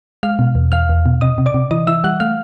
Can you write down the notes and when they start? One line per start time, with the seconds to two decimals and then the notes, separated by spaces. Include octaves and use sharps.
0.23 G#3 F5 F6
0.39 B2
0.55 E2
0.72 E2 F5 F6
0.89 E2
1.06 B2
1.21 C3 D#5 D#6
1.38 C3
1.46 D5 D6
1.54 C3
1.71 E3 D#5 D#6
1.87 E3 E5 E6
2.04 G3 F#5 F#6
2.20 A3 F5 F6